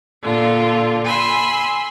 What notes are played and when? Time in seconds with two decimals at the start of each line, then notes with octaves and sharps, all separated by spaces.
0.23 A#2 D3 F4
1.05 G#5 B5 C6 E6